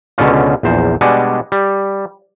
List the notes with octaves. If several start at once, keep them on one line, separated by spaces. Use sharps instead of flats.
C#2 B2 D3 C#4 F4
A#1 E2 C5
B2 G3 G#3 D4 F#5 G#5
G3